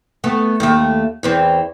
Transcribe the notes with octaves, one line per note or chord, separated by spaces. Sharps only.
A3 B3
D#2 A3
E2 E3 C4